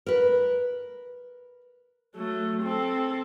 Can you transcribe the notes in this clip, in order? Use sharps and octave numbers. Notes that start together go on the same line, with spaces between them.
A#4 B4
F#3 A3
C4 A4